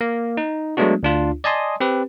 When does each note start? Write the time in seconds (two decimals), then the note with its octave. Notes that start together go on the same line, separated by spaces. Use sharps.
0.01 A#3
0.37 D#4
0.77 F#3 G#3 A3 B3 D4 F#4
1.03 D2 D4 F4
1.44 D5 D#5 G#5 A5 C6 D#6
1.80 C4 G4 B4